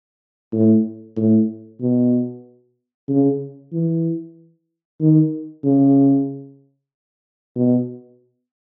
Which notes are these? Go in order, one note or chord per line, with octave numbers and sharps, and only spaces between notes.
A2
A2
B2
C#3
E3
D#3
C#3
B2